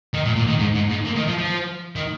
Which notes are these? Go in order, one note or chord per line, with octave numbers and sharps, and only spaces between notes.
D#3
A#2
A#2
D#3
G#2
G#2
G#2
A#2
D#3
F3
F3
D#3